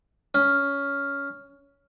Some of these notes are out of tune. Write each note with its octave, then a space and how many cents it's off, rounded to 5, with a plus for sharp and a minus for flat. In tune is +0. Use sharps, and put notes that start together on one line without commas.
C#4 +15